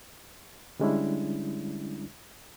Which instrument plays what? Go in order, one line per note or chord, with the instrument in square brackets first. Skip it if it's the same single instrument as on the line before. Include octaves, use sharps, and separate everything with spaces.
[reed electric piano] D3 G3 G#3 C#4 D4 E4